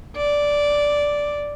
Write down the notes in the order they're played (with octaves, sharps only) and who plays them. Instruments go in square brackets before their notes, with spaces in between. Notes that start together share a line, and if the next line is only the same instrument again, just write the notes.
[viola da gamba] D5